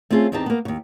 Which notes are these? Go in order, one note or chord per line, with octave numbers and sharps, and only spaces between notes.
A3 C4 C#4 F4 G#4
E2 C4 D#4 G4 A5
A#3 B3
D#2 C#3